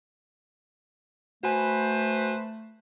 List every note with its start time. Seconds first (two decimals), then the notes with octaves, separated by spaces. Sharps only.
1.43 A3 B3 F#4 B4 C5 G#5